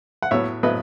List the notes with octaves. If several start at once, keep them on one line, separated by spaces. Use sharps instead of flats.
F#5
A2 F#3 B3 C#5 E5
A2 F#3 B3 B4 D#5